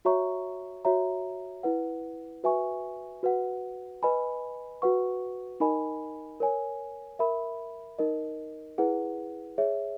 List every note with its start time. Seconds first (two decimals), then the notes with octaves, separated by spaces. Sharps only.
0.05 F#4 C#5 E5 A#5 C#6
0.85 F#4 C#5 E5 A#5
1.63 E4 B4 F#5
2.44 F#4 B4 E5 G#5 C#6
3.23 F#4 B4 F#5
4.03 B4 D#5 G#5 B5
4.82 F#4 B4 F#5 C#6
5.60 D#4 A#4 D#5 G#5 B5
6.40 A#4 C#5 G#5
7.19 A#4 E5 B5
7.99 D#4 A#4 D#5
8.78 E4 G#4 B4 F#5
9.58 G#4 C#5 E5